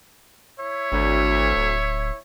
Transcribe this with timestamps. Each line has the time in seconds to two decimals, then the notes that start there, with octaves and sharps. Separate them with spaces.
0.59 E4 C#5 E5
0.92 G#1 D2
1.56 D1